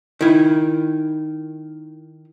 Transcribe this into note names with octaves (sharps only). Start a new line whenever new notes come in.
D#3 E4